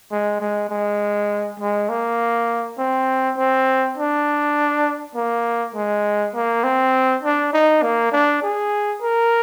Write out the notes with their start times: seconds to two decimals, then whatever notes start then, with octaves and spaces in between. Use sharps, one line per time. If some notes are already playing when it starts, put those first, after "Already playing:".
0.11 G#3
0.40 G#3
0.70 G#3
1.60 G#3
1.89 A#3
2.78 C4
3.37 C4
3.98 D4
5.15 A#3
5.75 G#3
6.34 A#3
6.64 C4
7.23 D4
7.53 D#4
7.82 A#3
8.12 D4
8.42 G#4
9.02 A#4